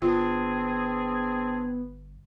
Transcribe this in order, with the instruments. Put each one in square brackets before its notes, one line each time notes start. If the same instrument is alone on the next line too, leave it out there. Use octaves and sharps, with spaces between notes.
[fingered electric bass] G1 [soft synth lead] B3 [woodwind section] C4 D4 G#4 [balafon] F4